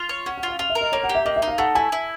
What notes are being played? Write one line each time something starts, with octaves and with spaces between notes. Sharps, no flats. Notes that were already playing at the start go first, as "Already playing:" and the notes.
Already playing: F4
C#5
C#4 F#5
F#5
F4
F5
F4 F5
E5
A#4
D#5
A#3 C#5
F#5
G4
E5
A#3 D#5
E5
D#4
F5
A3 F#5
E4 G#5
E4